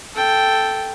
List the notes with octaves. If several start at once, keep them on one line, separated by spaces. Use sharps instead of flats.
A4 G5